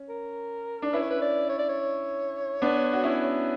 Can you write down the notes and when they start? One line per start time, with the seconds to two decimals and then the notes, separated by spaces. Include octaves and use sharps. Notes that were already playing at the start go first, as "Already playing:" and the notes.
Already playing: C#4
0.09 A#4
0.82 D4
0.93 C#4 E4 B4
1.02 C#5
1.11 B4
1.22 D5
1.49 C#5
1.59 D5
1.69 C#5
2.62 B3 D4
2.93 F#4
3.03 C#4 E4